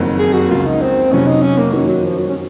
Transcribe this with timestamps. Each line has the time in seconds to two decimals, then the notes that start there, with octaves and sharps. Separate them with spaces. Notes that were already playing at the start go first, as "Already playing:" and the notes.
Already playing: F#1 F2 D#3 F#3 A#3
0.19 G#4
0.34 F#4
0.49 C#2 C#3 F3 A#3 F4
0.65 D#4
0.81 C4
1.11 F2 C3 F#3 C#4
1.27 D#4
1.43 C#4
1.57 A#3
1.73 F#2 D#3 F#3 A#3
1.88 F#3
2.03 F3
2.18 F#3
2.29 C#4